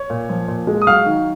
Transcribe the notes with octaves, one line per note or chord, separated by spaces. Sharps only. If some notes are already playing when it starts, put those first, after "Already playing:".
Already playing: C#5
A#2
F3
A#2
G#3
D#6
F#3 F5 F6
D#3